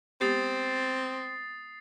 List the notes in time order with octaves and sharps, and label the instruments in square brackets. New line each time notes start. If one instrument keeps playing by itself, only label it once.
[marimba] G#3 B3 G4 [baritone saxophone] C4 [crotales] D#6 A6 C7